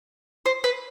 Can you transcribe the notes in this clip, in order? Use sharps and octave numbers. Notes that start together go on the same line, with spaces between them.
C5
B4